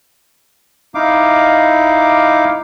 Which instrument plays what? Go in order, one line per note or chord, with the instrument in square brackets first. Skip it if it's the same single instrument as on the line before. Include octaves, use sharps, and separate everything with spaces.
[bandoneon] D#4 E4 F5 D6